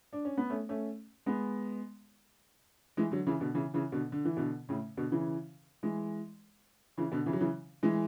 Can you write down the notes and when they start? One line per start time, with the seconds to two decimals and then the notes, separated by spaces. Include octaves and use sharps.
0.13 D4
0.25 C#4
0.37 B3
0.50 A3 C#4
0.69 A3 C#4
1.26 G#3 B3
2.97 E3 G#3
3.11 D3 F#3
3.27 C#3 E3
3.40 B2 D3
3.54 C#3 E3
3.74 C#3 E3
3.92 B2 D3
4.12 D3
4.25 E3
4.37 B2 D3
4.69 A2 C#3
4.97 B2 D3
5.12 C#3 E3
5.83 E3 G#3
6.97 C#3 E3
7.12 B2 D3
7.26 C#3 E3
7.33 F#3
7.40 C#3 E3
7.83 E3 G#3